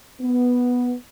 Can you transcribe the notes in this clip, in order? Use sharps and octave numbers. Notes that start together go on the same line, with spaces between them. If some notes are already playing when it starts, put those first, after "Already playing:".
B3